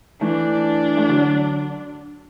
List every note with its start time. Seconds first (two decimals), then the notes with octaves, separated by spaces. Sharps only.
0.21 E3 A3 D4
0.97 A3
1.09 D3 F#3